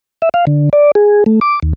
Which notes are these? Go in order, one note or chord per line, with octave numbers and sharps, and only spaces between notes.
E5
F5
D3
D5
G#4
A3
D6
D#2